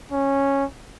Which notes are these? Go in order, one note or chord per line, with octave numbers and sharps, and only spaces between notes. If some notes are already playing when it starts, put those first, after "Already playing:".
C#4